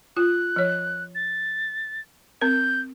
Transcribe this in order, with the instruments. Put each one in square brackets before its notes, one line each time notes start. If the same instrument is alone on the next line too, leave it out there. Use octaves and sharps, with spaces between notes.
[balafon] F4 [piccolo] F#6
[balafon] F3 C#5
[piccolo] A6
[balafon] C4 A#4 [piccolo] G6